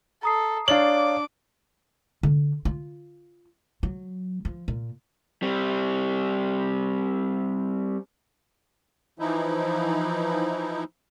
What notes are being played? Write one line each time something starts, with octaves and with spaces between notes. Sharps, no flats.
A4 A#5 D#6 C7
D4 C#5 D5 F5 D6 F#7
D3
F4
F#3
F3
A#2
G3 C4
E3 F3 D#4 E4